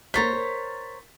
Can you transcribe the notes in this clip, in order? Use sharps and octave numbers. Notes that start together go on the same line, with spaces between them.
A#3 C5 C#5 A#5 A6 B6
A#4